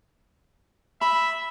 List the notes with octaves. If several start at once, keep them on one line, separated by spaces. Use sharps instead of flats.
E5 B5